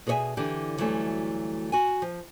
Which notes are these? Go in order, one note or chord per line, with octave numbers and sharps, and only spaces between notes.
B2 G#4 A#4 C#5 E5 G#5
D3 E3 G4
D2 E3 F#3 G3 A3 C#4
F#4 G#5
F3